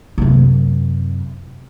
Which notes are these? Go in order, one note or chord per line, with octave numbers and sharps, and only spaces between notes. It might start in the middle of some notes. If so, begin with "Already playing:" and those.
F#2 C3